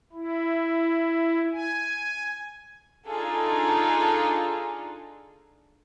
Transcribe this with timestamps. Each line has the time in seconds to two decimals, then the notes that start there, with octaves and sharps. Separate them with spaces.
0.13 E4
1.52 G#5
3.07 D4 D#4 F4 G#4 A4